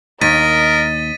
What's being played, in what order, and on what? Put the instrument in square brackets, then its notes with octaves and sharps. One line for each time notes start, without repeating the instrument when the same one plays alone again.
[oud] D#2 [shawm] A#4 [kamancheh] D#5 [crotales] A6 B6 D#7